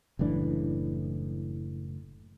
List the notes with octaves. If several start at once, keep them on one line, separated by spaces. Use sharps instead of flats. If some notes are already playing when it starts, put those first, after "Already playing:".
F#1 A2 E3 D4